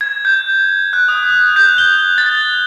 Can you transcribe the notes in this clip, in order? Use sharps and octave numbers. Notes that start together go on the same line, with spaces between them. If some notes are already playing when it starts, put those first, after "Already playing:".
G#6
G6
F#6
D#6
G6
G7
A6